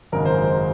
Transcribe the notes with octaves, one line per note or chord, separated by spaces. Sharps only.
G#1 F#2 C#3 G#3 A#4
C5